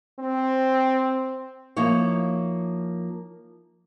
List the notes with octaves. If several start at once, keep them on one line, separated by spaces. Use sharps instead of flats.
C4
F3 A#3 D#4 E4 C#5